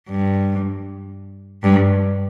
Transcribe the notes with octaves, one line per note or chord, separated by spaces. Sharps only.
G2
G2